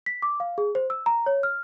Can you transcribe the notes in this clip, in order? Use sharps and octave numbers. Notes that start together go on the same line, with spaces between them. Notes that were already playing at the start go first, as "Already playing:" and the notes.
B6
D6
F5
G#4
C5
E6
A#5
C#5
F6